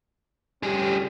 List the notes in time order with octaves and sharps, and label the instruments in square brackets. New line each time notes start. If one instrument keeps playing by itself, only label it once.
[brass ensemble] G1 C#4 G4 [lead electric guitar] G3 G#4